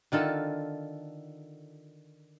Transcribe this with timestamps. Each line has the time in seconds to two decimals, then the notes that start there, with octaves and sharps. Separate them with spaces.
0.12 D3 D#3 F4 A4